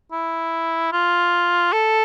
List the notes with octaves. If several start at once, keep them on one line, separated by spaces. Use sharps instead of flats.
E4
F4
A4